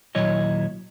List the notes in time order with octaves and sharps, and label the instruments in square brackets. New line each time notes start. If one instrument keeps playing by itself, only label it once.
[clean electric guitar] D#2 A#2 F#3 E4 C#5 D#5